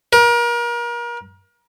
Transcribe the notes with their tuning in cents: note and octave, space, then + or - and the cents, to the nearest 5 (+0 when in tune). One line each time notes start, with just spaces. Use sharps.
A#4 +35